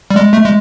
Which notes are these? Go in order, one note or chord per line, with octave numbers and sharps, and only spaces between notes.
G3
G#3
A3
G#3